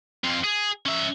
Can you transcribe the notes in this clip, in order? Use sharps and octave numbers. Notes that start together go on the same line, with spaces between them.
F2 F4
G#4
C#4 E5